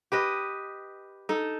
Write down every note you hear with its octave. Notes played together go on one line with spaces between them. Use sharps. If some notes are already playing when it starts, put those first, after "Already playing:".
G4 B4 D#5
D#4 A4